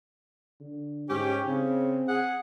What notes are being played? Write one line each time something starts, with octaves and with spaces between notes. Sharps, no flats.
D3
G#2 C#4 G4
C#3 C4
G#4 F#5